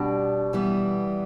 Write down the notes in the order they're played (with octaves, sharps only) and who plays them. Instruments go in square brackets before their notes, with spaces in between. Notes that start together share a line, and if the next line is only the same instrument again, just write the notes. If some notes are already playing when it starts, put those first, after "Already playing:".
Already playing: [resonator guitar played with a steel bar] B2 [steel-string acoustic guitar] G3 D4 G4
[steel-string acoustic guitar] E3 G3 B3